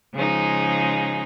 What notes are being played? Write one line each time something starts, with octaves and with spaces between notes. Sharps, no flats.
C#3 F3 G#3 D#4 G#4